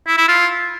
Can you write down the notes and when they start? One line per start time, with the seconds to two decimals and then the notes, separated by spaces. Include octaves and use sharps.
0.07 E4
0.17 E4
0.28 F4